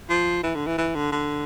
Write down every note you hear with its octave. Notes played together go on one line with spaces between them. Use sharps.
F3
E3
D3
E3
E3
D3
D3